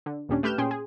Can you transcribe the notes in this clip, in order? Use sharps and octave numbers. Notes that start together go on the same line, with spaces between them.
D3
D#2 A#2 G3 C#4 D4
A3 G4 B4 F6 G6 E7
A#2 C#4 G#4 G5 C6
G#4